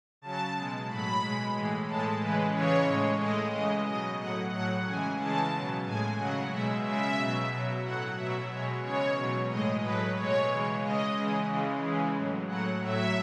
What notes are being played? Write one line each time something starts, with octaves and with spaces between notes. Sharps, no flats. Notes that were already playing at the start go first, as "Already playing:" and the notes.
C#3 F#3 A5
B2 G#3
A2 F#3 B5
B2 G#3
A2 E3 G#3
A2 G#3 A5
C#3 E3 G#3 B4
C#3 E3 G#3 C#5
A2 G#3
A2 G#3 D#5
C#3 E3 G#3 D#5
B2 F#3 D#5
A2 F#3 F#5
A2 F#3 F#5
C#3 E3 G#3 G#5
C#3 E3 G#3 A5
B2 F#3
A2 G#3 G#5
C#3 F#3 F#5
B2 G#3 E5
C#3 G#3 E5
B2 F#3
B2 F#3
A2 F#3 F#5
B2 F#3 E5
B2 G#3 C#5
C#3 E3 G#3 C#5
B2 F#3
A2 G#3 D#5
A2 F#3 B4
B2 G#3 C#5
C#3 E3 G#3
C#3 G#3 D#5
C#3 E3 G#3
C#3 E3 G#3
C#3 E3 G#3
A2 F#3
A2 F#3 F#5
A2 F#3 E5